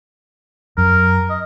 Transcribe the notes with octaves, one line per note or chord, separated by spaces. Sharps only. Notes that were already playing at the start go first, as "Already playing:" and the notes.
F#2 A#4
D#5